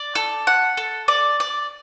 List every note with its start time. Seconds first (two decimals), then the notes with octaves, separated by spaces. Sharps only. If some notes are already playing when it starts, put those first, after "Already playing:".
Already playing: D5
0.15 A4
0.47 F#5
0.77 A4
1.08 D5
1.40 D5